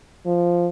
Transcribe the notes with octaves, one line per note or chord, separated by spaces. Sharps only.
F3